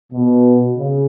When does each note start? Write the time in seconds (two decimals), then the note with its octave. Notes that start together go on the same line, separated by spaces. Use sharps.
0.13 B2
0.77 C#3